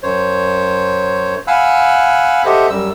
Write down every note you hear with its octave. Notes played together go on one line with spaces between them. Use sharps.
F#2 C5 C#5
F5 F#5 G#5 B5 E6 F#6
G4 A4 C5 D#5 E5 F#5
F#2 G3 E6